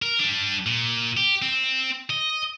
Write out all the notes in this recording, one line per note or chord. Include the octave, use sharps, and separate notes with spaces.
A#4
G3 D4
A#2
G4
C4
D#5